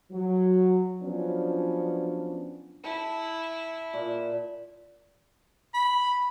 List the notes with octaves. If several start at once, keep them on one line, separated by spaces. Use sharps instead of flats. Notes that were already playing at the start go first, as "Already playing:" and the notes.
F#3
F3 F#3 B3 C#4 D4
E4 A5
A#2
B5